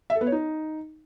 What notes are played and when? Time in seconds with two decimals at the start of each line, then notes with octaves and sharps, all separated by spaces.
0.10 E5
0.15 A4
0.21 B3
0.27 C#5
0.32 D#4